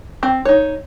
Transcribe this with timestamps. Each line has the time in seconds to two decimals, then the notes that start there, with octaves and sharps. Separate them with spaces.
0.23 C4
0.45 D#4 C#5